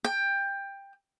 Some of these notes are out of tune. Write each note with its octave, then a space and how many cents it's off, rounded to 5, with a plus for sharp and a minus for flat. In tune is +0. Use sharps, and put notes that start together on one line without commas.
G5 +15